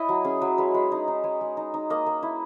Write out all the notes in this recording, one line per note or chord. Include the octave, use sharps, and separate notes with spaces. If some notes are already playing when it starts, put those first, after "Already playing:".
Already playing: E4 C#5 D#5
F#3
C#4 G#4
F#3
G#3 B4
G#3
D#4
D#4
G#3 C#5
G#3
D#4
D#4
A#3 D#5
A#3
E4